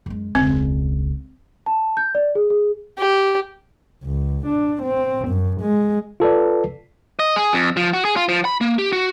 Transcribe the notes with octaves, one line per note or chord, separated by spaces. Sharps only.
F#2 G#3
E1 C#2 C4
A5
G6
D5
G#4
G#4
G4
C#2
D4
C4
F#2
G#3
F4 A4 B4 D5
D#5
G#4
F2
F3
F#4
G#4
F4
F3
B5
A#3
G4
F#4